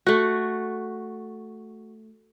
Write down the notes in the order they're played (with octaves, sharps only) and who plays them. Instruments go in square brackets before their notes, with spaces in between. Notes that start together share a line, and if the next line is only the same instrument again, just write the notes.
[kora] A3 F#4